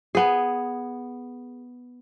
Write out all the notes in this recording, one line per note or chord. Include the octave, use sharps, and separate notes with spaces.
B3 G#4